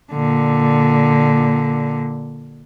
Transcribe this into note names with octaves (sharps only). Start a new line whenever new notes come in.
A#2 D3